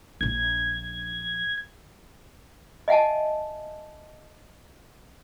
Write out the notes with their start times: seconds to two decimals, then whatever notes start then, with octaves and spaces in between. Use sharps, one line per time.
0.21 A#1 D4 G#6
2.88 D#5 E5 F#5 G#5 A5